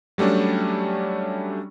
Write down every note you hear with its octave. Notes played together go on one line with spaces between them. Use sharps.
F#3 G3 A3 C#4 D4